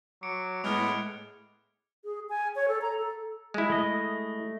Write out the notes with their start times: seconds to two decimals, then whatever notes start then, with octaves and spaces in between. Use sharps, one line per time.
0.23 F#3 D6 C#7 D7
0.64 A2 G#3 B3 F6 G#6 F7
2.05 G#4
2.29 G#5
2.56 C#5
2.68 A4
2.81 A#5
2.99 A4
3.54 G#3 E4
3.70 A3 D#5